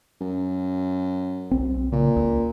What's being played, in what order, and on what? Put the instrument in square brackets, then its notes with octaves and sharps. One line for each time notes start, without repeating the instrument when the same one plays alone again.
[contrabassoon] F#2
[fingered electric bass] B1 C4
[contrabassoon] A#2 [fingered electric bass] C#3
[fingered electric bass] C#2